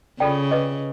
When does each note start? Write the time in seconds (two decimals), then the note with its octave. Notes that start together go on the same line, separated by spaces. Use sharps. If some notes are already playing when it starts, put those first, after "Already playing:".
0.20 C#3 F4 A4 D5 G5
0.51 G#4 B4 D#5